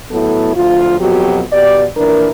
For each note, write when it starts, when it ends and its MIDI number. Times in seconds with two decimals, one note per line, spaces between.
0.11 0.56 45
0.11 0.56 54
0.11 0.56 59
0.11 0.56 64
0.11 0.56 69
0.56 1.00 38
0.56 1.00 53
0.56 1.00 65
1.00 1.42 41
1.00 1.42 47
1.00 1.42 54
1.00 1.42 66
1.00 1.42 67
1.52 1.86 47
1.52 1.86 67
1.52 1.86 74
1.97 2.30 46
1.97 2.30 52
1.97 2.30 62
1.97 2.30 70